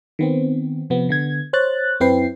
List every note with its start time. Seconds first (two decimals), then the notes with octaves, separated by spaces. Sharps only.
0.19 D#3 B3 C4
0.90 C3 F3 B3
1.09 D3 B3 G#6
1.53 C5 C#5 F#6 A6
2.00 F#2 C4 E4 B4 G5 C7